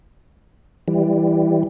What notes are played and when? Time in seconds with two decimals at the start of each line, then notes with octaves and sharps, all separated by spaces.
0.88 E3 G3